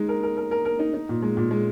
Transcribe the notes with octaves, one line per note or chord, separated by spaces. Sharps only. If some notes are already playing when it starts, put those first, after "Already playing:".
Already playing: G#3 D#4
A#4
A#4
A#4
A#4
A#4
D#4
D#4
A#2
G#3
A#2
G#3